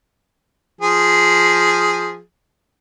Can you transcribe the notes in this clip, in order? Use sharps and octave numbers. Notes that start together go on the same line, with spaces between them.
F3 G#4